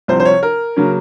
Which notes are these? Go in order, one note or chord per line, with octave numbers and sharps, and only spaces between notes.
C2 C3 F3 C5
C5
C#5
A#4
C#3 F#3 A#3 C#4